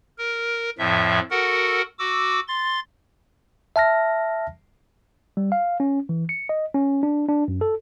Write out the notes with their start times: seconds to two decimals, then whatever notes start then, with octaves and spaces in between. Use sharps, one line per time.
0.18 A#4
0.79 F2 A2 F3 E5
1.31 F#4 A4 A#4 F#5
1.99 F#4 D6 E6
2.48 C6 A6
3.76 E5 A5 F6 A#6
5.37 G3
5.52 F5
5.80 C#4
6.09 E3
6.29 C#7
6.49 D#5
6.75 C#4
7.03 D4
7.28 D4
7.48 F#2
7.61 A4